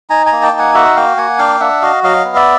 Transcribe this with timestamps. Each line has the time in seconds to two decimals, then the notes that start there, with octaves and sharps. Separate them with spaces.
0.10 D#4 G#5 A#5
0.26 G#5 A#5
0.32 A#3
0.42 G5 A5
0.53 D#4
0.59 F#5 G#5
0.74 F#4 E5 F#5
0.96 A#3 F5 G5
1.17 A#3 F#5 G#5
1.39 D4 F5 G5
1.60 D4 E5 F#5
1.82 F#4 D#5 F5
2.03 F#3 D#5 F5
2.25 B3
2.35 D5 E5